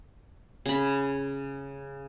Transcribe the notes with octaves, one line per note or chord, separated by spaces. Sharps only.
C#3 B5